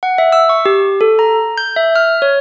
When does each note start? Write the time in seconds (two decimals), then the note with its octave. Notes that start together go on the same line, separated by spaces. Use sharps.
0.03 F#5
0.18 E5
0.32 E6
0.49 C#6
0.65 G4
1.01 A4
1.19 A#5
1.58 G6
1.76 E5
1.96 F6
2.22 C#5